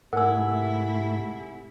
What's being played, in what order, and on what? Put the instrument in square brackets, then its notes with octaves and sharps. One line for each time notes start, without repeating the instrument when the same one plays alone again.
[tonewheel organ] G#2 A3 [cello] C3 E4 [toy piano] A#4 E6 [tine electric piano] F#5 G#5